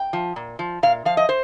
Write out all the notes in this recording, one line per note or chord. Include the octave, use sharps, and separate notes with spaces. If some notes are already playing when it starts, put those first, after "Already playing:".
Already playing: G5
F3
A#2
F3
A#2 F5
F3 F5
D#5
C5